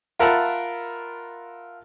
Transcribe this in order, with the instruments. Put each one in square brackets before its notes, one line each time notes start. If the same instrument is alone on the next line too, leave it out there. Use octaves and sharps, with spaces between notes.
[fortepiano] F4 A#4 E5 F#5 A5 B5